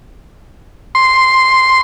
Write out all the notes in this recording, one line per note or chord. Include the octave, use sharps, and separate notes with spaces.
C6